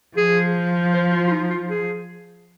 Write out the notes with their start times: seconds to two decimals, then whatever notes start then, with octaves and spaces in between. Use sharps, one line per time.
0.17 F3 G#4
0.94 C5
1.12 F4
1.28 F4
1.32 D#4
1.50 F4
1.69 G#4